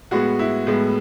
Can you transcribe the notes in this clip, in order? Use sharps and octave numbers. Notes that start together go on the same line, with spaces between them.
A2 G#3 B3 F#4
E4
A2 G#3 B3